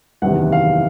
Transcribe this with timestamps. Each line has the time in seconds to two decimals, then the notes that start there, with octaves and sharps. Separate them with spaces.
0.22 F#1 E2 C3 D#3 F#5
0.52 F5